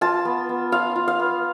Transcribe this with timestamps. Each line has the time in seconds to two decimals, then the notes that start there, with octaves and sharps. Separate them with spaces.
0.01 F4 A5
0.25 B3
0.49 B3
0.72 F4 F5
0.96 F4
1.08 F5
1.19 B3